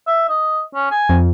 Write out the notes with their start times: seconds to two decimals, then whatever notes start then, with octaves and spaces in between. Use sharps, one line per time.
0.07 E5
0.29 D#5
0.75 C#4
0.91 G#5
1.09 F2